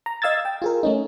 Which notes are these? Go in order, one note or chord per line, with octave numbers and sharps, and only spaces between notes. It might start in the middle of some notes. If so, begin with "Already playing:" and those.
A#5
D#5 F5 E6 G#6 A6
G5
F4 G#4 A#4
A3 C#4 D#4